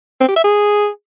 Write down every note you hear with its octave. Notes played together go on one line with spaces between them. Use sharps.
C4
G4
E5
G#4